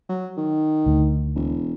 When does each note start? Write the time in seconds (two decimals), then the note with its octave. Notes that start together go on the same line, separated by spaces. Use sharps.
0.09 F#3
0.37 D#3
0.86 D2
1.35 E1